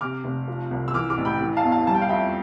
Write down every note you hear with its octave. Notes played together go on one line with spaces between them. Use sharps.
C3 D6 F6
F1
F3
C2
E6
E3 D6 F6
D6 F6
A1
G5 B5
E3
F5 A5
E2
F5 A5
G3 A5
G5
F5
F2 E5 G5